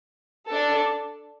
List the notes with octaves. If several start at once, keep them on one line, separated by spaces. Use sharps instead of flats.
D4 A4